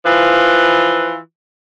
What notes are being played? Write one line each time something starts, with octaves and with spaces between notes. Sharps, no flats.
E3 F3 F4 B4